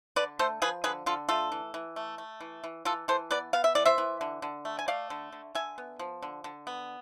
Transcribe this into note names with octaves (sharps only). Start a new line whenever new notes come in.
D3 B4 D5
A3 A4 C5
F3 G#4 B4
D3 G#4 B4
D3 F4 A4
A3 F4 A4
E3
E3
A3
A3
E3
E3
E3 F4 A4
E3 A4 C5
B3 B4 D5
B3 F5
E5
E3 D5
C5 E5
E3
D3
D3
A3
G#5
A3 D5 F5
D3
D3
D3 E5 G#5
B3
F3
D3
D3
B3